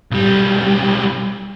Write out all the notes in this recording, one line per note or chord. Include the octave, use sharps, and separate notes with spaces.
B1 G3